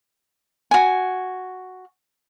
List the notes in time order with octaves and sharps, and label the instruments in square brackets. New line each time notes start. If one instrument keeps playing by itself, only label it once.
[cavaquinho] F#4 G#5